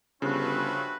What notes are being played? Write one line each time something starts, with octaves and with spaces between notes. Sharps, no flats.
G1 C#3 F3 A3 C4 D4 F#4 B4